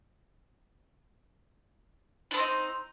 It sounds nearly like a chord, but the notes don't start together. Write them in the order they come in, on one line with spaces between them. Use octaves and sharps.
D4 B3 C4 D#4